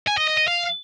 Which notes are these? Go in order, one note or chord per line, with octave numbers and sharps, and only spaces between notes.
G#5
D#5
D#5
D#5
F5